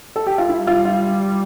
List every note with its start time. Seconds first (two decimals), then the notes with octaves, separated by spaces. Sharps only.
0.16 A4
0.27 G4
0.38 F4
0.49 G3 E4
0.67 F4
0.85 F4